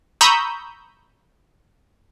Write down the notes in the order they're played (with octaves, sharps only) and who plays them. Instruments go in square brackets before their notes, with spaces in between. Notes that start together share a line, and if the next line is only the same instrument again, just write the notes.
[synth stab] A#5 B5 C#6 D#6 E6 G6